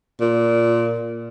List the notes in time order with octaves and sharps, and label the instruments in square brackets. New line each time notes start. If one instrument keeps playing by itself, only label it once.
[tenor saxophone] A#2